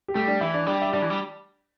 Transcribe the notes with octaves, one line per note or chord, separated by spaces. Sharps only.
G4
G3 A3 A4
D4 D5
E3 E4 E5
D4 D5
G3 D4 D5
E5
G3 D4 D5
E3
G3